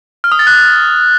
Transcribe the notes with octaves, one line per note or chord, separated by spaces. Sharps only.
F6
D#6
A6
F#6